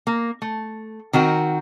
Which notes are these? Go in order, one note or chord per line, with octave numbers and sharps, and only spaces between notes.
A#3
A3
D#3 C4 F#4 A#4